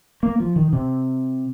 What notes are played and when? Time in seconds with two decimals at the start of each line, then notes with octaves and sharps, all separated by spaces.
0.23 A#3
0.40 F3
0.56 D#3
0.73 C3